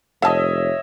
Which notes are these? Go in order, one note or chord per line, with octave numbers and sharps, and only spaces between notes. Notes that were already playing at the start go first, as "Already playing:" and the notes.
F1 C#5 D#5 E5 F#5 A5